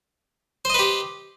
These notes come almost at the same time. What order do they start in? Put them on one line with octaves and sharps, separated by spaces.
C5 D#5 B4 G4